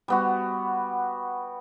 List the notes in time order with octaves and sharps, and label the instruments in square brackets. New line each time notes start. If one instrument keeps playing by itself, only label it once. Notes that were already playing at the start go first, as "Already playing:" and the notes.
[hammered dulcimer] G3 B3 F#4